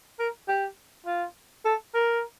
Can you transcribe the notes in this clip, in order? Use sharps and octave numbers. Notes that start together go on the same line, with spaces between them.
A#4
G4
F4
A4
A#4